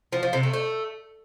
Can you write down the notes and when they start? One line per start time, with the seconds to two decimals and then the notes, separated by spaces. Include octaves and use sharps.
0.13 F3
0.23 F3
0.33 C3
0.43 A3
0.53 A3